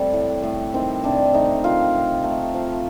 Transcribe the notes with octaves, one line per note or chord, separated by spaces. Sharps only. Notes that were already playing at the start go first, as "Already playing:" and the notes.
Already playing: C3 G3 A3 G4 A4
A2
A2
D#3 C4
C3 D4
A3 D#4
D#3 F4
C3
A3
F3